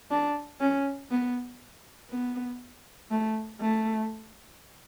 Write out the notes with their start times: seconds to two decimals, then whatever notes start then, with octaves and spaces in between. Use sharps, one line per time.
0.11 D4
0.60 C#4
1.11 B3
2.10 B3
3.10 A3
3.61 A3